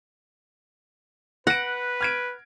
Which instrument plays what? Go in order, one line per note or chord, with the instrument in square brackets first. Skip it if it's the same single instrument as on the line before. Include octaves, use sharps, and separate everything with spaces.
[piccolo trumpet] B4 [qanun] F#5 [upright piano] A#6 D7
[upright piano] F6 G#6 D7